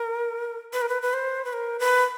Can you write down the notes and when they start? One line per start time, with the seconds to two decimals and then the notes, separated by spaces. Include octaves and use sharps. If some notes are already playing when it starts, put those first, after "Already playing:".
Already playing: A#4
0.73 B4
0.82 A#4
0.89 B4
1.02 B4
1.13 C5
1.45 B4
1.53 A#4
1.79 B4